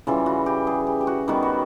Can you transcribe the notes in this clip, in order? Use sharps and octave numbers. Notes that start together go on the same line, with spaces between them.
C#3 E3 G3 F4
F#4
G4
G#4
G4
G4
F#4
D#3 G3 B3 F#4
F#4